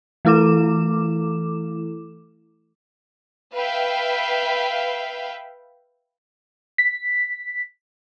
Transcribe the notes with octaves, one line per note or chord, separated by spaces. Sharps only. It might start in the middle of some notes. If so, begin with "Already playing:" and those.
E3 A3 E4 A4 D6 E7
B4 E5 F5 G5
B6